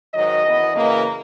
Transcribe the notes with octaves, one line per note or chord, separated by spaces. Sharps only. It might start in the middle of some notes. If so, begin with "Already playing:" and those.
G#2 D#3 F#3 D#5
F#2 E3 B3
F#2 C#3 E3 A#3